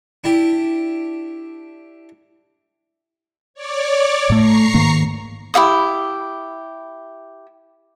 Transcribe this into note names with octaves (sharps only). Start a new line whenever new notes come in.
D4 E4 G4
C#5 D5 D6
A2 A3 A#5 C#6 C7
G#2 D#3 A#3
E4 G4 F5 D#6